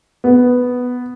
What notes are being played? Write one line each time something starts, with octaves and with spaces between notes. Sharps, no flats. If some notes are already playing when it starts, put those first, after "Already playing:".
B3